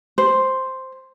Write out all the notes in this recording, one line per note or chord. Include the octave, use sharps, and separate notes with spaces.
C5